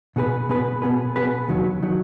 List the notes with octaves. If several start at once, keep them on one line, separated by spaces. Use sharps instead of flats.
B2 B3 G#4 B4
B2 B3 G#4 B4
B2 B3 G#4 B4
B2 B3 G#4 B4
D#2 D#3 F#3
D#3 F#3